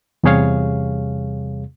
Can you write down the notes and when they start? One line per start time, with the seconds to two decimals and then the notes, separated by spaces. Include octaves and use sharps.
0.23 E2 C3 G3 G#4 C#5 F5